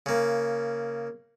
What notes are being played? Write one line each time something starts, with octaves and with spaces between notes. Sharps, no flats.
C#3 A#3